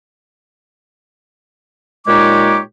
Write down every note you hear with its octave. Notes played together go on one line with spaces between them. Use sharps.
A#2 G#3 D#4 G4 C#5 D6